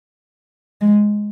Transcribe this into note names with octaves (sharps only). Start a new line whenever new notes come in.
G#3